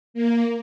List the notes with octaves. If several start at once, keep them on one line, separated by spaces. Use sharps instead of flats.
A#3